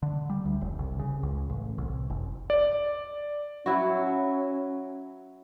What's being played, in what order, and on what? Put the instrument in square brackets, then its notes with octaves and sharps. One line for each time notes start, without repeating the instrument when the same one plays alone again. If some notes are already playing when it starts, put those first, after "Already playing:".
[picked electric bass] D3
G3
D2
F1
C2
C#3
C#2
A1
C2
F#1
[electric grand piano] D5
[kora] F#3 E4 F#4 [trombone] C#4